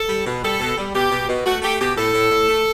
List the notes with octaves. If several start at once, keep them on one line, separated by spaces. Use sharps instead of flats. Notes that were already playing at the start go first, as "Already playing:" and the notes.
Already playing: A4
G3
B2
G3 A4
B2
G3
B2 G4
B2
B2
A3 F#4
A3 G4
B2 G4
A2 A4
A2
A2
A3